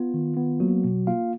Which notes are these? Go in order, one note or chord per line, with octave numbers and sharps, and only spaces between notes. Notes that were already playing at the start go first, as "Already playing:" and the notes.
Already playing: B3 F4
D#3
B3
F#3 A#3 F#4
B2
A#3 F4 F5